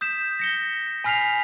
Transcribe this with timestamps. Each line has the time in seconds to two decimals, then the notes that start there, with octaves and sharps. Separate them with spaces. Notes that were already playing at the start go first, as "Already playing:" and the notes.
0.01 D#6 G6 B6 E7
0.39 A#6 C#7 G7
1.04 G#5 B5 F6 B6 C7 F7